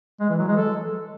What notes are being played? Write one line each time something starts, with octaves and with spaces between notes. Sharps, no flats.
G#3
E3
F#3
G#3
A4